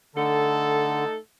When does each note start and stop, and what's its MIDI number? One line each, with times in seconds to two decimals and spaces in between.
0.15 1.05 50
0.15 1.16 57
0.15 1.16 63
0.15 1.16 69